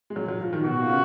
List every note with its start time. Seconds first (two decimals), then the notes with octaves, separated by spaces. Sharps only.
0.10 G#3
0.16 F#3
0.28 F#3
0.41 F3
0.53 D#3
0.64 B2 F#4
0.81 A#2
0.89 C#3